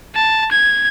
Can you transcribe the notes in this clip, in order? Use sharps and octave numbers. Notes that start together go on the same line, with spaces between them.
A5
G#6